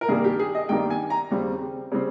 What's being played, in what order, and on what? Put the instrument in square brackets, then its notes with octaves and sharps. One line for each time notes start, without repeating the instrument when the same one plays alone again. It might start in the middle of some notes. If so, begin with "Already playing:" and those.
[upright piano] A#4
G2 D#3 G3 A#3 G#4
G4
G#4
D#5
G2 D#3 G3 A#3 G5
G#5
A#5
D#2 C#3 G3 C4
C#3 G3 C4